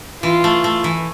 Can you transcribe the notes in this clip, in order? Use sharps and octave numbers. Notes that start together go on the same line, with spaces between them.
E3 F4
A3
A3
E3